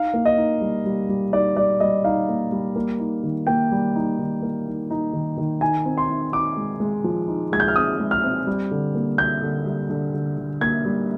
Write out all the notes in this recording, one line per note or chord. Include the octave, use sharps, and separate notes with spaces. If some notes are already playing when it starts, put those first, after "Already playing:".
Already playing: D#4 F5
A#3
D#5
D#4
G3
G3
G3
D#4 D5
G3 D5
G3 D#5
D#4 F5
A#3
G3
A#3
D#4
D#3
A#3 G5
G3
D#4
D#3
A#3
D#4
D#4
D#3
D#3
D#4 G#5
C4
C6
D#4
D#4 D6
G#3
G#3
F3
D#4
G#3 G#6
G6
F6
C4 D#6
G#3
F6
C4
G3
D3
A#3
A#3 G6
D3
G3
D3
D3
D3
A#3 G#6
G3